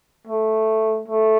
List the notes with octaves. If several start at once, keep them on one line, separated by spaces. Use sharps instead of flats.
A3
A3